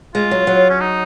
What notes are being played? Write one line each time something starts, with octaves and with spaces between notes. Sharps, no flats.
G#3 F4
F#3
F#3
C#4
D#4